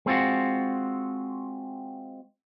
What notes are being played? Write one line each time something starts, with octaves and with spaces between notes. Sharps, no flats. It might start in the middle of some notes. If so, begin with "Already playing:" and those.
G#3 C4 F4 F#4